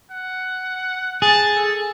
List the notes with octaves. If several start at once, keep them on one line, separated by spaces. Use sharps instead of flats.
F#5
G#4 A5
A4